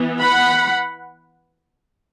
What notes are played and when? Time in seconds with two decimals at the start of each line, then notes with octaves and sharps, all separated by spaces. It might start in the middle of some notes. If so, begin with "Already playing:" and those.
Already playing: E3 B3
0.19 F#5 B5